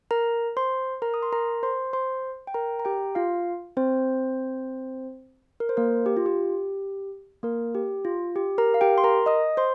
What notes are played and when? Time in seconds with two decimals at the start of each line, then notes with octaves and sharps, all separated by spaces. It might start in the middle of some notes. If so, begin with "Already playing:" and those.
0.11 A#4 A#5
0.57 C5 C6
1.02 A#4 A#5
1.14 D#6
1.23 C6
1.32 A#4 A#5
1.63 C5 C6
1.93 C5 C6
2.47 G5
2.54 A#4 A#5
2.80 A#5
2.85 G4 G5
3.15 F4 F5
3.77 C4 C5
5.60 A#4
5.69 C5
5.77 A#3 A#4
6.06 G4
6.17 F4
6.26 G4
7.43 A#3 A#4
7.75 G4
8.05 F4
8.36 G4
8.58 A#4 A#5
8.74 F5
8.81 G4 G5
8.98 C6
9.04 A#4 A#5
9.26 D#5 D#6
9.57 C5 C6